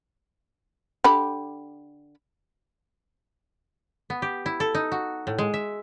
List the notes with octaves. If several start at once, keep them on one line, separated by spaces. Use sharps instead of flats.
D3 G4 B5
B3
G4
E4
A4
D#4
F#4
A2
G#3
E5